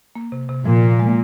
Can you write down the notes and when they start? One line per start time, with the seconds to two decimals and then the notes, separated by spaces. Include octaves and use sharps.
0.15 A#3
0.32 C3
0.49 C3
0.65 A#2 F3
0.83 F3
0.99 G#3